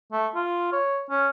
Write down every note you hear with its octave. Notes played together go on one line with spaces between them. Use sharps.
A3
F4
C#5
C#4